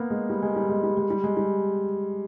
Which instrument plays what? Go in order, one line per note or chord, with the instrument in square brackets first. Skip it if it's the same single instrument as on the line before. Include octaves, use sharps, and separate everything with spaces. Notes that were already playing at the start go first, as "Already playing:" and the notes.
Already playing: [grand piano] A#3 B3
G#3
G3
G#3
G3
G#3
G3
G#3
G3
G#3
G3